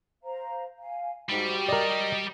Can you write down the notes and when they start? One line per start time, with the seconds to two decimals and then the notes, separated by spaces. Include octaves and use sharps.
0.24 C5 F5 A#5
0.79 F5 G#5
1.30 G#2 G3 F#4 G4 G5
1.68 A#4 D5 D#5